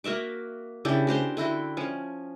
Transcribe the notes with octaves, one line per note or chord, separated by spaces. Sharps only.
A#3 F#4 E5 D6
C#3 D4 E4 G4
F#4 G4 C5 C6
D3 E4 F#4 G5
F3 C#4